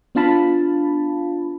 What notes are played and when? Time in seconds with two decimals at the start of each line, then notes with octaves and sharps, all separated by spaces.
0.15 B3 D4 F4 F5 A5 B5